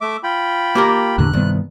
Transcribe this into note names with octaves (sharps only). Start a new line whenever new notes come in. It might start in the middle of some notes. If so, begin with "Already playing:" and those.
A3 E5 D6
F4 G5 B5
A#3 G4 A#4
E2 A2 D3 F#6
C2 G2 D#3 B3